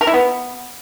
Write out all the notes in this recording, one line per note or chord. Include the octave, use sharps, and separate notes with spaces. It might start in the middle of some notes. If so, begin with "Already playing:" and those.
A#4
E4
B3